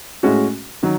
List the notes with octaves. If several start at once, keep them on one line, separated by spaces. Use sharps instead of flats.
A2 G#3 C#4 F#4
D#3 F#3